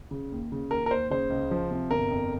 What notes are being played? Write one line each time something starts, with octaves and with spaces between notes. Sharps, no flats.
C#3
D#2
C#3
D#2 A#4
A#4
D#2 C5
C#3 C5
C#2
F3
C3
G1 A#4
F2